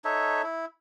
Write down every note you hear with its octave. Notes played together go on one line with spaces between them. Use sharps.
D#4 A4 C#5 E5
E4